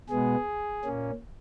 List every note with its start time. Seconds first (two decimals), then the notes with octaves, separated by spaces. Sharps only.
0.09 B2 G#3 B3 G#4
0.85 A#2 A#3 C#4